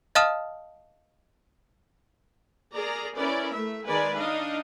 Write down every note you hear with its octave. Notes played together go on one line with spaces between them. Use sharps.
D#5 F5 A5 D#6 F6 E7
G#4 A#4 D5 A#5
C#4 E4 A#4 B4 D5
A3 E5
D#3 G#3 A#4 B4 D5 G#5
D4 D#4 D#5 F5